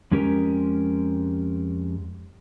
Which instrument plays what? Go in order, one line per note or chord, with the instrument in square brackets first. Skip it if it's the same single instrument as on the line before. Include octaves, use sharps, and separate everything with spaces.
[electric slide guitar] F2 G#3 C#4 G4 A#4